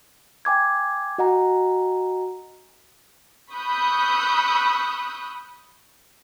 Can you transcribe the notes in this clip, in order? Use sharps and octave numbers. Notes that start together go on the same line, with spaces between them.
G5 G#5 D6 G#6
F#4 D#5 F#5 G#5 A#5
B5 C#6 D#6 E6 F#6 G6